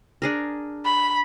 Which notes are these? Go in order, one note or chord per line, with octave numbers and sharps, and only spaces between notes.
D4 G#4 A#4
B5